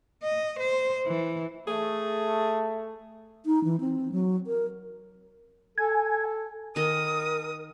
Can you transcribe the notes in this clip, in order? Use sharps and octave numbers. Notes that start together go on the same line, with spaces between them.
D#5
C5
E3
A3 G#4
D#4
E3
C4
F#3
A#4
A4 G#5
D#3 A#4 D#5 D#6